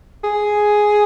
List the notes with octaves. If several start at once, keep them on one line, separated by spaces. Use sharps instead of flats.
G#4